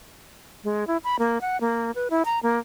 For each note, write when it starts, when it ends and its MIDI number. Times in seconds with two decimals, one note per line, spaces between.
0.64 0.87 56
0.87 0.97 64
1.04 1.16 83
1.19 1.38 58
1.41 1.60 78
1.61 1.91 58
1.95 2.08 71
2.10 2.23 64
2.25 2.39 82
2.43 2.59 58